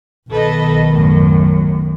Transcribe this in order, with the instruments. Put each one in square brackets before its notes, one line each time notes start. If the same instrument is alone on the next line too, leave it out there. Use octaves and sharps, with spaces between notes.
[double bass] B1 D#3 [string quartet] A4 B4 D#5
[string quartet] F#2 A2